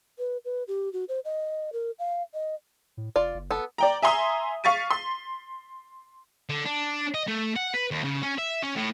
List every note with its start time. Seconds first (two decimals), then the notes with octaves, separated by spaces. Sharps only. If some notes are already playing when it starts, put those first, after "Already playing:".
0.19 B4
0.45 B4
0.68 G4
0.93 F#4
1.09 C5
1.25 D#5
1.73 A#4
1.99 F5
2.34 D#5
2.97 A2
3.16 F1 F4 D5
3.34 F#1
3.51 B3 A4
3.78 D5 G5 A#5
4.02 E5 G#5 A#5 C6 D#6
4.64 F5 C#6 A6 B6 D#7
4.91 C6
6.50 D3
6.65 D4
7.14 D#5
7.28 A3
7.56 F#5
7.74 B4
7.91 D#2
8.04 C#3
8.23 C#4
8.38 E5
8.62 C#4
8.75 A2